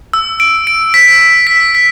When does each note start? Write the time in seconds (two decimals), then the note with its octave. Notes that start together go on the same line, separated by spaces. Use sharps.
0.13 E6
0.40 D7
0.67 D7
0.94 B6
1.21 B6
1.47 B6
1.75 B6